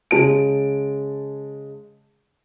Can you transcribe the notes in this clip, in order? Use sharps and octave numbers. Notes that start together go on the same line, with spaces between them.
C#3 G#3 A5 D7